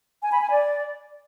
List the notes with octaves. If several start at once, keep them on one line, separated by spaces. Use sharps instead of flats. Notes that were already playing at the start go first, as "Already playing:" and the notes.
G#5
B5
G#5
D5